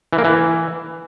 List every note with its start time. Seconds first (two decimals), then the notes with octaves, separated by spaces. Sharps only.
0.13 E3
0.18 A#3
0.24 E3